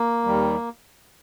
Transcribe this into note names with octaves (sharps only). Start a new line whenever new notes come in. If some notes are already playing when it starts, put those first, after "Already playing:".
Already playing: A#3
D#2 D#3 G3